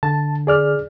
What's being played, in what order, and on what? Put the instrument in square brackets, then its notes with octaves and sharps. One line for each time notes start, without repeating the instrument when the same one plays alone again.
[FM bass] D3 [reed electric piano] A5
[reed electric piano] G#4 D5 F6